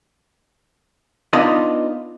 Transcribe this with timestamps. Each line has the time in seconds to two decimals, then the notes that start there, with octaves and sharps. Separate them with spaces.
1.33 B3 D4 D#4 F4 B4 D#5